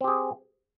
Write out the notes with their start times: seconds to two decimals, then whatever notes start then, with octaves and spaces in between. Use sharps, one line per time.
0.01 C4
0.04 G4
0.08 G#4